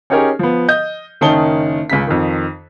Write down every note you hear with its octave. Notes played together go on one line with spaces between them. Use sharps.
C#4 D#4 G4 G#4 A#4 C#5
F3 B3
D#5 G6
F#1 D#3 C#4 D#4 A5 G7
C#2 C#3 B6
F2 D#3